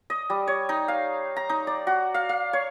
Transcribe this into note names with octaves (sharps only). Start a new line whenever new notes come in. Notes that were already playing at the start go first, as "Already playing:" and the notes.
D#5
G3
C#5
D#4
F5
A#5
D#4
D5
F#4
F5
F5
C#5